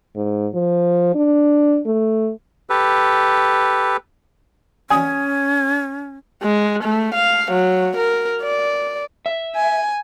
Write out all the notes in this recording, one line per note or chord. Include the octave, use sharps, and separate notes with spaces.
G#2
F3
D4
A3
G4 A4 B4
C#4 G#5 D#6
G#3
A3
F5
F#3
A#4
D5
E5
G#5